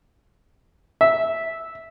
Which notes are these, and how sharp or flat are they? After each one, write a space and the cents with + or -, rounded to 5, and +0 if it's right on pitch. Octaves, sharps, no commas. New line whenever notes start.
E5 -10